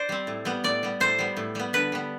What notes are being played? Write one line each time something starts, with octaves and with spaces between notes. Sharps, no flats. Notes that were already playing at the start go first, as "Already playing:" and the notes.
Already playing: C5 D5
G3 C4
A2
G3 B3
A2 D5
G3 B3
A2 C5
G3 B3
A2
G3 B3
D3 B4
G3 B3